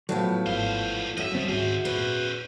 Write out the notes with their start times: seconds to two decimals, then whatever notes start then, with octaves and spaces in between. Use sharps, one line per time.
0.09 A2 F3 F#3 B3
0.47 G#1 E2 C5 F5
1.18 F#2 G3 D#4 D#5 E5
1.35 D#3 F3 G3 C4
1.49 C#2 G#2 D#3 F#4 G#4 C5 E5
1.85 E2 A#2 C#4 B4 C5